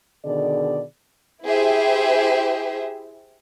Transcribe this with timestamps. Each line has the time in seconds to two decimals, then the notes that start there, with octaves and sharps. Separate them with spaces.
0.25 B2 D3 D#3 G#4 D5
1.44 E4 G4 G#4 C5 E5